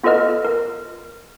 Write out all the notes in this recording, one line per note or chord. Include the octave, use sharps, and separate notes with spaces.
B3 F4 A4 B4 D#5 F6
A#4